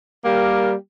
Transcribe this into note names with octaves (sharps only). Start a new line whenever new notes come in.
G3 A#3 G4 A#4